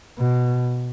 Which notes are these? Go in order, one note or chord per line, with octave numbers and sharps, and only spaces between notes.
B2